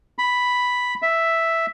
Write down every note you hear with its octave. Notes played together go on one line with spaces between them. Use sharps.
B5
E5